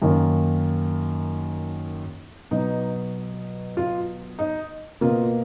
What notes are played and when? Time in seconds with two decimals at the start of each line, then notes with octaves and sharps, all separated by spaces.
0.02 F#2 D#3 A#3
2.51 B2 F#3 B3 D#4
3.77 F4
4.39 D#4
5.01 B2 A#3 F4